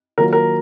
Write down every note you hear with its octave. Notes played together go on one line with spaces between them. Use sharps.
D#3 F#3 A#3 F4 A#4
A#4